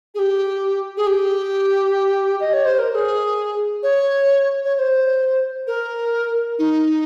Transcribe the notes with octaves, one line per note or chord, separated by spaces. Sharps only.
G#4
G4
G#4
G4
D#5
C#5
C5
A#4
A#4
G#4
C#5
C#5
C#5
C5
A#4
D#4